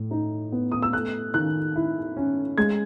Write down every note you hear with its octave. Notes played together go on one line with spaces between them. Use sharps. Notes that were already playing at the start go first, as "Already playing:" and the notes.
Already playing: A2
D#4
B3
D#6
E6
A3 F#6
D#3 F#6
E4
C#4
G#3 G#6